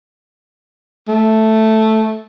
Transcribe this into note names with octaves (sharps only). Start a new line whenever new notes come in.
A3